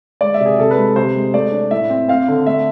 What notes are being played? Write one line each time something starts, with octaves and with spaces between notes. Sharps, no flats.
G#3 D5
E5
C3
G#4
C3 A4
B4
G#3
C3 C5
G#3
A3 D5
D4
A2 E5
C4
C4 F5
D3
A3 E5